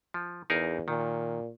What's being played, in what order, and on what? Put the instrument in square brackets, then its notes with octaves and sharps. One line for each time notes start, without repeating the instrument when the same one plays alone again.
[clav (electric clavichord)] F3
[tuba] E2 [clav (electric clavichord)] D#4 G#4 A#4
[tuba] A#2 [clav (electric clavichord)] D#3